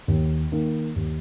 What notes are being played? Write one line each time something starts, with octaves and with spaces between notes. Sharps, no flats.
D#2
D#3 A#3
D#2